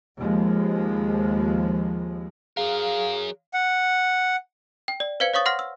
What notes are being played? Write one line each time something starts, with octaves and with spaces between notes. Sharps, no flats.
D#2 F3 G#3
F#3 G#4 A#4 F5
F#5
G5
D5
B4 C5 F5 G#6 C#7
C#5 F5 C#6 D#6 A6
F#5 C6 F6 A#6
E6